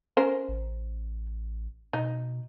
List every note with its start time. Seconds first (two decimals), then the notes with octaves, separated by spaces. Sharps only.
0.17 C#4 A#4 C5
0.48 A1
1.93 B2 D#4